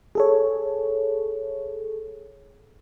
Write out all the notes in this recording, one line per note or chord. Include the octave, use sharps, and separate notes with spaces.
G#4 A4 C#5